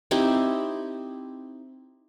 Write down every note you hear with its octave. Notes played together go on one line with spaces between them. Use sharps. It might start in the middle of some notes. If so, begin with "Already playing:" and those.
C4 D#4 E4 G4